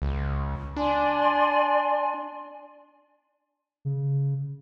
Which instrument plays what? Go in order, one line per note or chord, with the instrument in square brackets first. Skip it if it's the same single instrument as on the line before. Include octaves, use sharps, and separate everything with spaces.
[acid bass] C#2
[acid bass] D4 [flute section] D5 G#5 C6
[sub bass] C#3